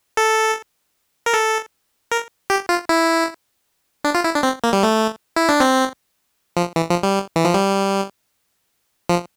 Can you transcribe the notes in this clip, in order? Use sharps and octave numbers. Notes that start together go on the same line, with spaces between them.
A4
A#4
A4
A#4
G4
F4
E4
D4
F4
E4
D4
C4
A#3
G3
A3
E4
D4
C4
F3
E3
F3
G3
E3
F3
G3
F3